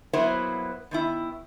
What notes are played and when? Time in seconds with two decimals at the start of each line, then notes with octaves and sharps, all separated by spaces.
0.13 F#3 A#3 B3 E4 B4 C5
0.91 D#3 B3 E4